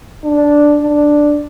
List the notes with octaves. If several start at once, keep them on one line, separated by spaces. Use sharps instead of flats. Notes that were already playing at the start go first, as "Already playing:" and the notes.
D4
D4